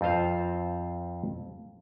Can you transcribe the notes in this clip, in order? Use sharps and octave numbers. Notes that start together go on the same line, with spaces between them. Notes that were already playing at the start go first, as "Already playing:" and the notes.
F2 C4 F4 C5 F5